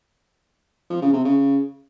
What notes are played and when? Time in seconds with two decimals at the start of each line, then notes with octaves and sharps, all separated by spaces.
0.90 F3
1.02 C#3
1.13 C3
1.25 C#3